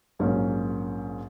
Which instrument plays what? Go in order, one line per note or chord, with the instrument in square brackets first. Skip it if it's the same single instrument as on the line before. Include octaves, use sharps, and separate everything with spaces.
[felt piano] A#1 G#2 F#3 A#3 C#4